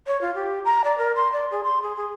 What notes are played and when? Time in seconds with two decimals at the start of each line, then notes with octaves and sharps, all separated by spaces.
0.07 C#5
0.21 F4
0.34 G4
0.65 A#5
0.84 D5
0.98 A#4
1.16 C6
1.32 D5
1.51 G#4
1.64 C6
1.82 G#4
1.96 G#4